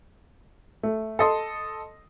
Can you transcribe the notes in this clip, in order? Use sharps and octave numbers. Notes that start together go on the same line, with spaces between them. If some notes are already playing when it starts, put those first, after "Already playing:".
A3
A4 D#5 C6